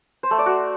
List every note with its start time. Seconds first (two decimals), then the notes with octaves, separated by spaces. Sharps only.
0.23 C5
0.31 A3
0.38 D5
0.46 F#4